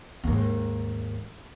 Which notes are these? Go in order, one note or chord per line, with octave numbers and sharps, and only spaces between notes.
D#2 G#2